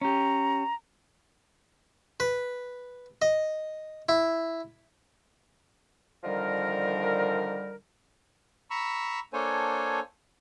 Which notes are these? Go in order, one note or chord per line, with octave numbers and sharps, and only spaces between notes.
C#4 G4 A#5
B4
D#5
E4
D3 D#3 F3 G3 A#4
A#5 B5 C#6 E6
A#3 D4 A4 C5 C#5 G#5